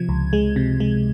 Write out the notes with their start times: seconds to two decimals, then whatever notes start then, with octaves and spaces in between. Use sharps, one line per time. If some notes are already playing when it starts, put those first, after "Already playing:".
Already playing: C3 F3 G#6
0.09 C#2
0.33 G#3
0.56 C3
0.80 G#3